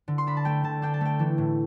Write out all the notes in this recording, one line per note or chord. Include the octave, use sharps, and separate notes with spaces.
D3
C6
D4 B5
A5
A3 G5
D3 A5
D4 G5
A5
A3 G5
E3 A4
A2